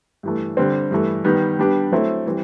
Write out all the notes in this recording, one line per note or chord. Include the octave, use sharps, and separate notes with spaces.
G2 E3 A3
D3 G3 C4
G2 E3 A3
D#3 G3 B3
G3 B3 D4 G4
F#3 A3 C4 E4
E3 G3 C4